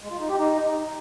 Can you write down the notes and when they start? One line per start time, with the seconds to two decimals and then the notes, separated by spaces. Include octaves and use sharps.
0.02 G#3
0.11 F4
0.20 D#4
0.29 G4
0.38 D#4